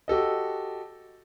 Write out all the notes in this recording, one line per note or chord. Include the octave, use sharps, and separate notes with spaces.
F#4 G4 A4 D#5